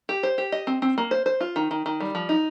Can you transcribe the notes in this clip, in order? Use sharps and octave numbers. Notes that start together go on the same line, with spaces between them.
G4
C5
G4
D#5
C4
C4
A#3
C5
C5
F4
D#3
D#3
D#3
G3
F3
D#4